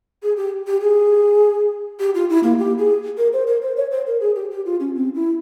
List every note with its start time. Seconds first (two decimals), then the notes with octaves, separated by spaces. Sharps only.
0.23 G#4
0.37 G4
0.67 G4
0.81 G#4
2.00 G4
2.15 F4
2.29 E4
2.43 A#3
2.59 G4
2.78 G#4
3.18 A#4
3.33 C5
3.47 A#4
3.62 C5
3.76 C#5
3.91 C5
4.07 A#4
4.21 G#4
4.36 G4
4.51 G4
4.65 F4
4.80 C#4
4.95 C4
5.15 E4